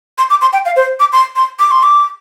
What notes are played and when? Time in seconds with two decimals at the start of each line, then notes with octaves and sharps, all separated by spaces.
0.18 C6
0.30 D6
0.41 C6
0.53 G5
0.65 F5
0.76 C5
1.00 D6
1.13 C6
1.36 C6
1.59 D6
1.71 C6
1.83 D6